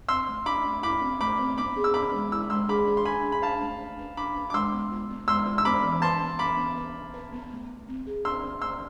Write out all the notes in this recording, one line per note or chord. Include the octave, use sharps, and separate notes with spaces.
C4 C6 E6
A3
A3 B5 D6
A3
E4 B5 D6
C4
A3 B5 D6
C4
B3 B5 D6
G#4
E6
B3 B5 D6
G#3
E4 E6
G#3 C6 E6
G#4 B5 D6
G#4
C6
D4 G#5 B5
G#4
B5
D4 F5 A5
A3
D4
B4
D4 B5 D6
B4
D6
G#3 C6 E6
B3
F4
B3
G#3 C6 E6
F4
E6
B3 B5 D6
E3
B4 A5 C6
B3
B3 B5 D6
B3
B4
B3
B4
B3
A3
A3
C4
G#4
C4 C6 E6
C4
A3 C6 E6